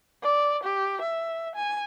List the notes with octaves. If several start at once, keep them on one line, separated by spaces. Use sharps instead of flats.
D5
G4
E5
G#5